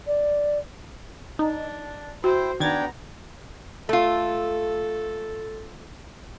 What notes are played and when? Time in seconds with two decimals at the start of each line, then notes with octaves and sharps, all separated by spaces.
0.07 D5
1.39 D4 D#4
2.24 E4 F#4 C5 G5
2.60 D#3 B3 D4 G5 A#5 G#6 A6
3.89 A3 F4 A4